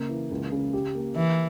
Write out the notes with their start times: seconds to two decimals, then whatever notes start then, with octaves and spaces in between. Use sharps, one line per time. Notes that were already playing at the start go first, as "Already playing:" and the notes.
Already playing: C#3 A#3
0.09 E3
0.31 C#2
0.52 C#3
0.73 G4
0.95 A#3
1.16 E3 E4